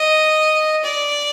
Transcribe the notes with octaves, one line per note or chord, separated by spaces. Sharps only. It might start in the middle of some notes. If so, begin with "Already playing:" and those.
Already playing: D#5
D5